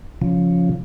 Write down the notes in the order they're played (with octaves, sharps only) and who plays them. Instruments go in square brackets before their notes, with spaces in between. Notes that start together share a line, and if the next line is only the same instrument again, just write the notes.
[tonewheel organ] C#3 F3